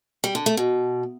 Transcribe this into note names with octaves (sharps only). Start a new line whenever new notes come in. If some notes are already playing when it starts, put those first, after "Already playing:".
G3
D3
A3
B2